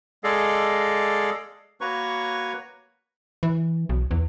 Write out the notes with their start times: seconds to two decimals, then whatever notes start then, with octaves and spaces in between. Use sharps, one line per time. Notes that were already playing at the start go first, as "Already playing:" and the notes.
0.24 G#3 G#4 A4 D5 D#5 F5
1.81 A#3 F#4 B4 C#5 A#5 C#6
3.43 E3
3.89 B1
4.11 E2